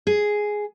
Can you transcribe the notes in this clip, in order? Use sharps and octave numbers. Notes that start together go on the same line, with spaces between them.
G#4